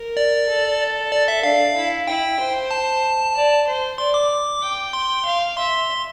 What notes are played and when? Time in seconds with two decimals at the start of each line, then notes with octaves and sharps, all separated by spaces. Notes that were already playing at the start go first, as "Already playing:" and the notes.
Already playing: A#4
0.17 D5
0.48 A4
1.12 D5
1.28 E5
1.43 D4 F5
1.76 E4
2.07 E4 G5
2.40 C5
2.71 A5
3.35 D5
3.67 C5
3.98 D5 C6
4.14 D6
4.62 G5
4.93 C6
5.25 F5
5.58 E5 C6